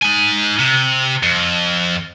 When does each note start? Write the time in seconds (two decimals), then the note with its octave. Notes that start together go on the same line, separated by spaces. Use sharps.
0.03 D#4 G#5
0.59 C3
1.23 F2